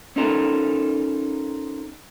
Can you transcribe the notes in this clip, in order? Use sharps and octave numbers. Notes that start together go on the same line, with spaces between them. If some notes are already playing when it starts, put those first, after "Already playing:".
C4 C#4 D#4 F4 A4 A#4